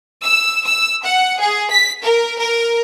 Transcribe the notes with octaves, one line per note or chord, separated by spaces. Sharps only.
E6
E6
F#5
G#4
B6
A#4
A#4